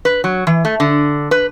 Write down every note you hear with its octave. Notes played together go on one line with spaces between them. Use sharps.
B4
F#3
E3
A3
D3
B4